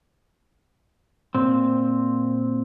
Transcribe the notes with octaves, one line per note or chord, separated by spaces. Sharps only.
A#2 C4